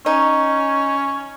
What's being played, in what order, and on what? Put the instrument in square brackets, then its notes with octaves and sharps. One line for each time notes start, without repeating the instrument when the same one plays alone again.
[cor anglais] C#4 [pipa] D#4